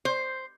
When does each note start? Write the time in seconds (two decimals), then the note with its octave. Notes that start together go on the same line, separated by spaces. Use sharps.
0.05 C5